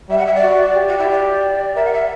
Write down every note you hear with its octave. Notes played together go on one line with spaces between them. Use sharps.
G3 E5
F#5
E5
D5
F#4
G4
F#4
E4
D5
A#4 E5
F#5
E5